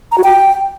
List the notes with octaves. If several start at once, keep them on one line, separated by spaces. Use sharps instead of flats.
A#5
F#4
G5